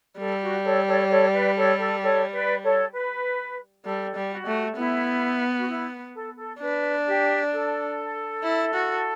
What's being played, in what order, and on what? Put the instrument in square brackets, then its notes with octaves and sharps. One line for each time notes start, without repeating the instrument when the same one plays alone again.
[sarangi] G3 [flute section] A4
[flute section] F#4
A4 C#5
A4 C#5
D5
A4 C#5
B4 D5
A4 C#5
A4
A4 C#5
B4 D5
A4 C#5
B4
[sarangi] G3 [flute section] A4
[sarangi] G3
[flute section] F#4
[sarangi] A3
[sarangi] B3 [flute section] E4
[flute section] F#4
E4
A4
A4
[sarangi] D4 [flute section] B4
[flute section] G4
A4
[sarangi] E4
F#4